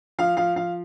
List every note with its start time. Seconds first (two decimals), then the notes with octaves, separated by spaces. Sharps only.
0.18 F3 F5
0.37 F3 F5
0.56 F3 F5